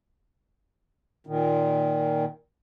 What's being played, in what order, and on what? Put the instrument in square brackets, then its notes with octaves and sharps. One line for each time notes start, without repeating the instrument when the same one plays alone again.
[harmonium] A#2 D#3